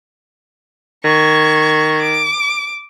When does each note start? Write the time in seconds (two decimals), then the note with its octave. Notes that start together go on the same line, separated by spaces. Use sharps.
1.04 D#3 C#6 G#6
2.02 D6